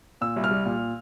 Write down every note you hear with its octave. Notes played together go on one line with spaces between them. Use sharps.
A#2 E6
C2
F6
G3
A#2